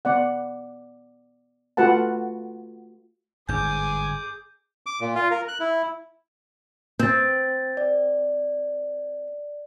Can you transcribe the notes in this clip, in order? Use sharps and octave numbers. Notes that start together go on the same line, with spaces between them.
B3 D5 F#5
A3 F4 F#4 B4 F#5 A5
G1 G#2 G#4 G#5 D6 G6
D6
A#2
F4
A#4
F#6
E4
C4 G6 A6
D5